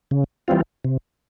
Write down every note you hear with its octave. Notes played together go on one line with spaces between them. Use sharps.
C#3
E3 G3 C4 F4
C3